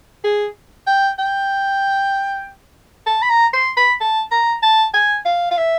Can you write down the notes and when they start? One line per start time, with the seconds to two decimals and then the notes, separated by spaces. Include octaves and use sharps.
0.24 G#4
0.87 G5
1.18 G5
3.06 A5
3.22 B5
3.30 A#5
3.53 C6
3.77 B5
4.00 A5
4.31 A#5
4.62 A5
4.94 G#5
5.25 F5
5.51 F5
5.57 E5